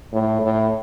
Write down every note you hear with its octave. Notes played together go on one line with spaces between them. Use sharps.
A2
A2